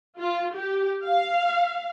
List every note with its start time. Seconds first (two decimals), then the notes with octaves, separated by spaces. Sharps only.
0.18 F4
0.55 G4
1.04 F5